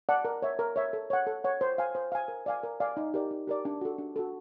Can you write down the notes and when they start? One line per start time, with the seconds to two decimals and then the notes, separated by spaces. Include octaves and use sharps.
0.09 D5 F#5 A5
0.25 A#4
0.42 C#5 E5
0.59 A#4
0.76 C#5 E5
0.93 A4
1.10 C#5 F#5
1.27 A4
1.44 C#5 F#5
1.61 C5
1.78 F5 G#5
1.95 C5
2.12 F5 G#5
2.28 A#4
2.46 D5 F5 G#5
2.63 A#4
2.80 D5 F5 G#5
2.97 D#4
3.14 G4 A#4 D5
3.31 D#4
3.47 G4 A#4 D5
3.65 D4
3.81 F#4 A4
3.98 D4
4.16 F#4 A4